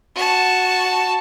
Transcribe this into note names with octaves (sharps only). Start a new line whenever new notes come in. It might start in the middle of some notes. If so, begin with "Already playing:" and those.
F#4 A5